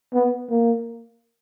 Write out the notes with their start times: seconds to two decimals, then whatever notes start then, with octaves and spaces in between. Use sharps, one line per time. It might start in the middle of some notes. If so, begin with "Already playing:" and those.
0.14 B3
0.50 A#3